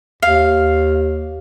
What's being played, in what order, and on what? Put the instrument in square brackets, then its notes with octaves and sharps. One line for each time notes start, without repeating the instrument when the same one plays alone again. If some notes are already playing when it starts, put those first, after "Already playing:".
[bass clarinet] D#2 [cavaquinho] F5